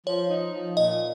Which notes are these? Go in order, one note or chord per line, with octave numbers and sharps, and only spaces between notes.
F3 C#5
D#4
F3
A#2 D#5